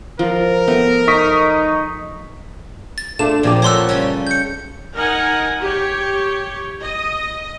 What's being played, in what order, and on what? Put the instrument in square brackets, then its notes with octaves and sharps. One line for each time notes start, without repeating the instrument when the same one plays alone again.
[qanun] F3 [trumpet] A#4
[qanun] A3 [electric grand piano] B3
[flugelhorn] D#4 [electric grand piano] C#6 D#6 B6
[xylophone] A6
[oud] A3 D4 F4 [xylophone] E7
[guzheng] F2 G#4 [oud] A#2 F3 G4
[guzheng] A3 C#4 F#4 [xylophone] C#5 C6 E6
[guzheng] C#3 G3 C#4
[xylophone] G6 C#7
[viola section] D#4 A#4 F#5 G#5
G4 C#5
D#5